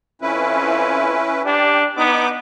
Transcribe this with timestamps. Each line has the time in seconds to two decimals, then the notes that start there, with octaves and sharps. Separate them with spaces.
0.22 F2 C#4 E4 B4
1.45 D4 G4
1.97 B3 D#4 D6